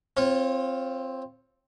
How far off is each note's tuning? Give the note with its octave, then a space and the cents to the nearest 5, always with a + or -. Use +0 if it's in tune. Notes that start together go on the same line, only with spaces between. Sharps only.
C4 +5 F4 +0 C#5 -25